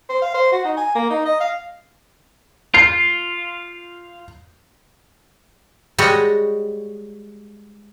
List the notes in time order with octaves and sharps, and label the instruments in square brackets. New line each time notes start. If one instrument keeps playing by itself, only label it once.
[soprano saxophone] C5
F5
C5
F#4
D#4
G#5
A#3
D#4
D#5
F5
[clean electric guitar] F4 [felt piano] C7
[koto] G3 G#3 F#4 C#5 D#5